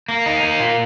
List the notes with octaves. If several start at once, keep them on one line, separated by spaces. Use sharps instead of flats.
A#3
D#4
A#3
A#2